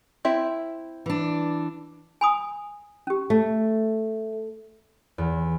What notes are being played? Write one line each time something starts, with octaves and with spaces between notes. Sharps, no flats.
C4 E4 E5
E3 D4
G#5 B5 D#6
C#4 G4
A3
E2